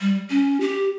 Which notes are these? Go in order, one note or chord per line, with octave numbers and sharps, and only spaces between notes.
G3
C#4
G4